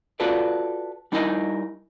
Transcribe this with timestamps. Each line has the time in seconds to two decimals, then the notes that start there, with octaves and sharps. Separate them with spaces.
0.20 F4 F#4 A4 B4 D5
1.12 G3 D#4 E4 A#4 D#5